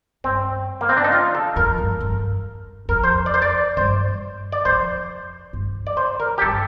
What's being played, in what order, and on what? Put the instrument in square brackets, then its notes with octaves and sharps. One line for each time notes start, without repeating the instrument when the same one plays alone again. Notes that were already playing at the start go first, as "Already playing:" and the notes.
[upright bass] G2 [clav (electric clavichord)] C4
[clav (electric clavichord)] A#3
C4
D4
D#4
F4
A4
[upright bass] F2 [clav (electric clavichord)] A#4
[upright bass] G2
G2
[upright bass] F2 [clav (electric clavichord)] A#4
[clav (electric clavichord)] C5
D5
C5
D5
[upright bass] G2 [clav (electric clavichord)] C5
[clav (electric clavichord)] D5
[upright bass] F2 [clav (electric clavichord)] C5
[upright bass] G2
[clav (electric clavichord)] D5
C5
A#4
G4
[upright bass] G2 [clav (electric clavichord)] A4